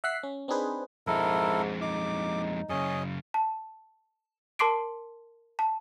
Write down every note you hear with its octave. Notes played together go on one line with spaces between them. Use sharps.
E5 F#5 F#6 B6 C7
C#4
C4 D4 D#4 G#4 B4 C5
F2 G#2 G#3 E4 A4 A#4
D#4 D6
F#2 C#3 C#4 G#4 D#5
A5
A#4 A5 C6 D6 C7 D7
A5